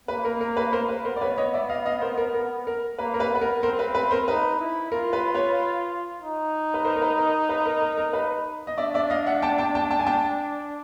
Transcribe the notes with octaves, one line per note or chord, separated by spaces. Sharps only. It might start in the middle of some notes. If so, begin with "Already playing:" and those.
A#3 B4
A#4
A#4
B4
A#4 C5
B4
B3 A#4 C5
D5
B4 C#5
C#5 D#5
D5 E5
D#5 F5
D#5 F5
A#4 C5
A#4
A#4
A#4
A#3 B4
A#4
B4
B3 B4
A#4
C4 A#4 C5
B4
B4
A#4 C5
D#4 B4
E4
F4 A#4
B4
B4 C#5
D#4
B4
A#4 C5
A#4
B4
A#4
B4
A#4
A#4
A#4
B4
D#5
D4 D5 E5
D5 E5
D#5 F5
E5 F#5
G5 A5
G5 A5
G5 A5
G5 A5
G#5
G5 A5